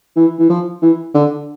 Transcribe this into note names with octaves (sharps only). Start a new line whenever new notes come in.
E3
E3
F3
E3
D3